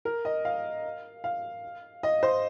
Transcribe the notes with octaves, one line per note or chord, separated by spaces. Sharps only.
A#4
D#5
F5
F5
D#5
C5